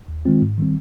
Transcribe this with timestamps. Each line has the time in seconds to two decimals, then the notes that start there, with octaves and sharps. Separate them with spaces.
0.08 D#2
0.25 D#3 G#3 C4 F4
0.42 G#2
0.58 D#3 G3 C4